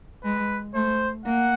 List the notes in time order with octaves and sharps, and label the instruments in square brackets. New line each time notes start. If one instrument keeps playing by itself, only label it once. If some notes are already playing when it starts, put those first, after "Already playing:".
[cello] G#3 [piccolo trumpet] B4
[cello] A3 [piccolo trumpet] C5
[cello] A#3 [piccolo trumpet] F#5